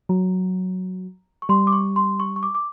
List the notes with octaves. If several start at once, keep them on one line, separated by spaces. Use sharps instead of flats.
F#3 A#5
C#6
G3 C6
D6
C#6
C6
C#6
C#6
D6
D6